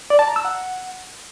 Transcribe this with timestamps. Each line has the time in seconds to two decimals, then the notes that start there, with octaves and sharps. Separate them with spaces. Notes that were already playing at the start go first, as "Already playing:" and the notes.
0.10 D5
0.19 A5
0.27 A#5
0.36 E6
0.45 F#5